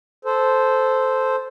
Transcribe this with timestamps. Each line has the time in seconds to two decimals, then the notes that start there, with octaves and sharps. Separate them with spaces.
0.25 A4 C5